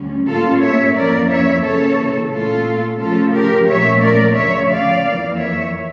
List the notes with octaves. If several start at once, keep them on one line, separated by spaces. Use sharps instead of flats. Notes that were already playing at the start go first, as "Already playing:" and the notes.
Already playing: D2 D3 G3 C#4
A2 G3 A#3 C#4 F4 A4
C#5 E5
F2 E3 A#3 C#4 A#4 D5
C#5 E5
C#3 E3 A#3 A4 C#5
A#2 A3 C#4 F4 A4
C#3 F3 A3 C#4 F4 A4
G4 A#4
A#2 F3 A3 C#4 C#5 E5
A#4 D5
D2 C#3 F3 C#5 E5
D5 F5
F2 E3 A#3
C#5 E5